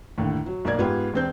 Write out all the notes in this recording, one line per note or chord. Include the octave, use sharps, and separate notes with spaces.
D#2 A2 D3
F#3
B1 A#3 D5 G#6
G#2 B3 F4 G4
E1 C4 G6